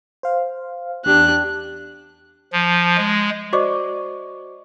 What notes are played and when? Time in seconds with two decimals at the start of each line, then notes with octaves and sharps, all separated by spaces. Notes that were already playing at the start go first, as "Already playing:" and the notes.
0.23 C5 F5
1.05 E2 D4 G4 F#6
2.53 F3
2.97 G#3
3.53 F#4 C5 D5 D#5 C#6 D6